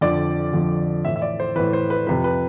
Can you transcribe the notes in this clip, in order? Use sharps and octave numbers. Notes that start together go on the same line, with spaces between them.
F2 D3 F3 D5
F2 D3 F3
A2 E3 E5
E5
D5
C5
A2 E3 B4
C5
B4
F2 C3 F3 B4
B4